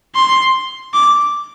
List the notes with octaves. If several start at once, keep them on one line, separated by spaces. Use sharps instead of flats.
C6
D6